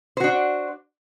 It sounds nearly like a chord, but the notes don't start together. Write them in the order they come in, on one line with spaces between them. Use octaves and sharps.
C5 F#4 D4